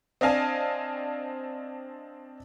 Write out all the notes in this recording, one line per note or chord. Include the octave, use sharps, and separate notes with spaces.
C4 D4 D#5 F5 G#5 A5